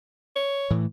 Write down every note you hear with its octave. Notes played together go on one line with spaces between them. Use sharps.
C#5
A2 E3 A3